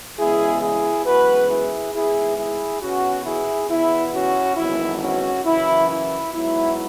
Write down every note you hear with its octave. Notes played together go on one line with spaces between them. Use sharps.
E2 C#3 G#3 B3 E4 G#4
E4 G#4
F#2 E3 G#3 B3 F#4 B4
E4 G#4
G#1 G#2 G#3 B3 E4 G#4
E4 G#4
E2 B2 B3 C#4 F#4
E4 G#4
E2 B2 B3 E4
C#4 F#4
G#1 F#2 E3 B3 E4
C#4 F#4
F#2 C#3 E3 E4
E4
G#2 F#3 B3 E4